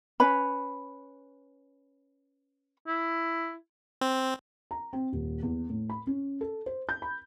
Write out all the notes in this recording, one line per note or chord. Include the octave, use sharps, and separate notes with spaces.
C#4 B4 C#5 B5
E4
C4
A#5
C4
D#1
E2
A2
B5
C#4
A4
C5
G6
B5